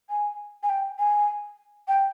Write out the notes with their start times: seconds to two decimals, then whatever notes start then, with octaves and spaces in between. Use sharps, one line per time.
0.10 G#5
0.63 G#5
0.69 G5
0.99 G#5
1.88 G5